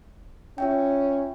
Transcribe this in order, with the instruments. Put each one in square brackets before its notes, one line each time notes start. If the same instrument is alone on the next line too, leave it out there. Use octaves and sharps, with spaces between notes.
[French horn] C#4 [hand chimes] F4 E5 G5